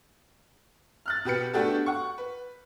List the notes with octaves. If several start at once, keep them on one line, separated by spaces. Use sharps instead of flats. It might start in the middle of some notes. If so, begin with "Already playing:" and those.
F6 F#6 A6
B2 G4 B4 C#7
A3 B3 D4 F#4 G4 A4
F#5 C#6
B4